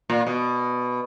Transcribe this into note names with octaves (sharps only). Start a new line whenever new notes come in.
A#2
B2